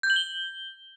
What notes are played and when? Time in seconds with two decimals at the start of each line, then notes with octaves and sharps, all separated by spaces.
0.03 G6
0.10 F#7
0.16 G7